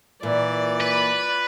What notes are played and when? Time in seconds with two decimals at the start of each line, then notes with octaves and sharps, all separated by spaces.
0.23 A#2 E3 D5
0.81 B4